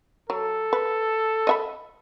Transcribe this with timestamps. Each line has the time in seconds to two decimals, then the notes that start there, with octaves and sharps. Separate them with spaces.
0.30 F#3 A4
0.73 B4
1.47 D#5 E5 B5